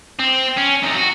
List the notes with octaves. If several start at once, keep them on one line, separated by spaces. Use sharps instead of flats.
C4
C#4
C3 D#4
F#4